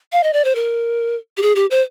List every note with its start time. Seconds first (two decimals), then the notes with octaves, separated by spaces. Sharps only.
0.13 F5
0.24 D#5
0.33 D5
0.45 C5
0.55 A#4
1.37 G4
1.42 G#4
1.56 G4
1.71 C5